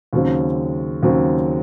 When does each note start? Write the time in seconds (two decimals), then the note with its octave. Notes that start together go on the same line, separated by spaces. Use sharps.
0.13 D#2 C#3 F#3 C4
1.03 D#2 C#3 F#3 C4